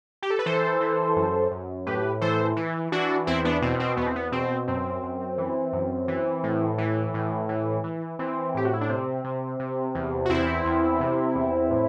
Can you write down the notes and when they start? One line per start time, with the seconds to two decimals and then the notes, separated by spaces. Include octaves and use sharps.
0.22 G4
0.30 A4
0.39 B4
0.46 E3 A4 C5
0.81 E3
1.16 F#2
1.51 F#2
1.87 A2 G4 B4
2.21 E3 A4 C5
2.57 E3
2.92 E3 D4 F#4
3.27 E2 C4 E4
3.45 B3 D4
3.62 B2 C4
3.80 C4
3.97 E2 B3
4.06 C4
4.16 B3
4.32 B2 C4
4.68 F#2 C4
5.03 F#2
5.38 E3
5.73 F#2
6.08 E3
6.44 A2
6.78 E3
7.14 A2
7.49 E3
7.84 E3
8.19 E3 C4
8.55 A2 G4
8.65 F#4
8.73 E4
8.81 D4
8.89 C3 C4
9.24 C3
9.60 C3
9.95 E2
10.25 F#4
10.30 E2 C4 E4
10.65 E2
11.01 C3
11.35 E2
11.70 A2